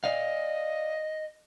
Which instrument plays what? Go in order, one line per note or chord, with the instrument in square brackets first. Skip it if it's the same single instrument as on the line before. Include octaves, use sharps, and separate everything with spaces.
[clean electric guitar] D5 F5 [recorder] D#5